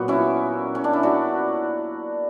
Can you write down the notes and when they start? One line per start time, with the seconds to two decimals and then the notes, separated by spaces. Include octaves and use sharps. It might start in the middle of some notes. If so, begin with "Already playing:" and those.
Already playing: A#2 F#3 B3 F#4
0.08 C#4 E4
0.75 C#4
0.84 D4
0.93 E4
1.03 D4 F#4